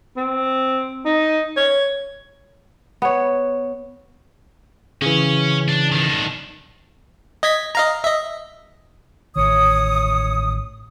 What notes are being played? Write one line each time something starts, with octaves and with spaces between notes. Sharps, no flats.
C4
D#4
C#5
B3 C#5
C#3 E3 C#4
D4
D#3 D4
D#5 G#6 B6
D#5 F5 A#5
D#5 E5
A1 D#3 C#5 D#6